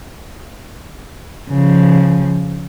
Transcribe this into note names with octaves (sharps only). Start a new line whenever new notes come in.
C#3 F3